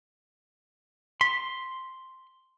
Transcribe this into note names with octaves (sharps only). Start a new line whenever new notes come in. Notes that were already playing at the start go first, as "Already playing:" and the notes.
C6 B6